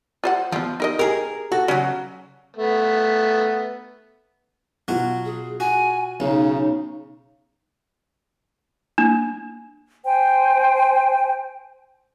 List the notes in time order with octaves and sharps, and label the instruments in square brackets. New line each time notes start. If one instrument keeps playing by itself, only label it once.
[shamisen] F4 C5 F#5
[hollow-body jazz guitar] F3 [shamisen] B3 F4
[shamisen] D#4 A#4 D#5
[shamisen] G4 [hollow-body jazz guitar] G#4 A#4
[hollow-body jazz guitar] F#4 [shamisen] A4
[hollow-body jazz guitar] C#3 F#3 [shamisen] C#4
[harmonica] A3 B3
[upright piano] B2 F4 [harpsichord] F#3 F#4
[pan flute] G#4
[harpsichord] F#4 [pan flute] G#5
[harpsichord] B1 [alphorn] C#3 [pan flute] D#4
[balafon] A#3 [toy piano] D4
[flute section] C5 G5 G#5